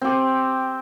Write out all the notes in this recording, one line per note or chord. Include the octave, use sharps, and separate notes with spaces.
C4 G4